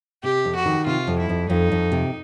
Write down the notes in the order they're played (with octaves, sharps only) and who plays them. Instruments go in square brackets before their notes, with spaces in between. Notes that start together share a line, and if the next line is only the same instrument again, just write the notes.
[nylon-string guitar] C3 [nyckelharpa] G4
[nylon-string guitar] F2
[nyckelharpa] F#4
[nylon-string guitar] D#3
[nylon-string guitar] C3 [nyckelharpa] F4
[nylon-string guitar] F2
[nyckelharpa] E4
[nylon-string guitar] F2
[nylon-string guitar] F2 [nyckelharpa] D#4
[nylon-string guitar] F2
C3